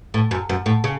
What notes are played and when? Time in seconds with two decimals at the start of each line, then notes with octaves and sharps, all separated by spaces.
0.14 A2
0.31 F#2
0.49 F#2
0.66 A2
0.84 C#3